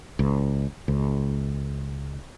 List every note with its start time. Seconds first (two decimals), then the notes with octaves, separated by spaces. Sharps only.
0.19 C#2
0.88 C#2